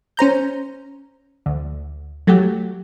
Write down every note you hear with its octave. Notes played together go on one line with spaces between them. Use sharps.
C#4 C5 A#5 G6
D2
F#3 A3 F#4 G4